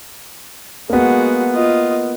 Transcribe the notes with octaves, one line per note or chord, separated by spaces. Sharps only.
G#3 A#3 B3 F#4
F4 D#5